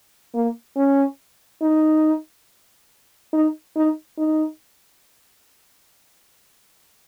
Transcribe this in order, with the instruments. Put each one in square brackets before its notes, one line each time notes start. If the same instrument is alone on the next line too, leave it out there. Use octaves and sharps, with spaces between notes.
[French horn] A#3
C#4
D#4
D#4
D#4
D#4